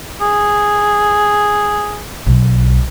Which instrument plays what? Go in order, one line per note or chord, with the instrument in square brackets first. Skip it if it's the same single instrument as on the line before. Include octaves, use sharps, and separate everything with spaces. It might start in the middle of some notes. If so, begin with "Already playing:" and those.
[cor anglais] G#4
[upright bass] B1